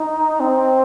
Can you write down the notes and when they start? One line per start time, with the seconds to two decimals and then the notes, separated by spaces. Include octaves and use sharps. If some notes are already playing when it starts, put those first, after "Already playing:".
Already playing: D#4
0.40 C4